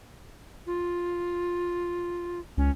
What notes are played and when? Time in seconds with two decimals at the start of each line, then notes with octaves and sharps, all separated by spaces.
0.67 F4
2.57 C#2 C#4